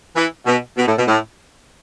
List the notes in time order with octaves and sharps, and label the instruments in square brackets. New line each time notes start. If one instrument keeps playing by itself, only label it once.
[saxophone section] E3
B2
B2
A2
B2
A2